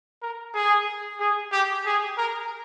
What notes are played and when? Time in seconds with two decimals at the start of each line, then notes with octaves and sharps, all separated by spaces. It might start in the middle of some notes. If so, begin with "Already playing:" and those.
0.22 A#4
0.54 G#4
1.20 G#4
1.52 G4
1.85 G#4
2.17 A#4